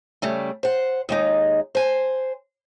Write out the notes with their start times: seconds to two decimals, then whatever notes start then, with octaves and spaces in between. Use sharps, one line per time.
0.22 C#3 G3 A3
0.63 C5 F#5
1.09 D#2 G#3 D#4
1.75 C5 G#5